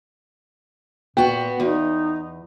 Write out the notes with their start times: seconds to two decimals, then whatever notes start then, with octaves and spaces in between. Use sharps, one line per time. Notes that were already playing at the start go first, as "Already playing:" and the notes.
1.17 A#2 B3 F#4 G5
1.60 E2 D#4